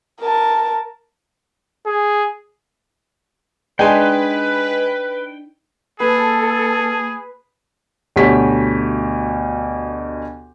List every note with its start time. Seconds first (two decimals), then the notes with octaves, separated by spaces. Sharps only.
0.21 A#4 A5
1.86 G#4
3.79 G#3 D4 D#4 B4 G5 G#5 C6
6.00 A#3 G#4 A4 B4
8.16 D2 B2 G4 C#5 B6